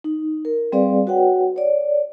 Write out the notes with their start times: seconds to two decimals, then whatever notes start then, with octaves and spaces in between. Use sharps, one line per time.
0.04 D#4
0.45 A#4
0.72 G3 C4 G#4 B4 D5 F5
1.07 F#4 B4 C#5 F#5 G5
1.56 C#5 D5